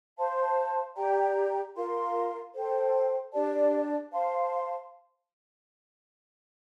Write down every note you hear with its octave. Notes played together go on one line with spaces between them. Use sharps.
C5 F5 A5 C6
G4 D5 G5 A#5
F4 A#4 F5 C6
A4 C5 G5
D4 G4 D5 A5
C5 F5 A5 C6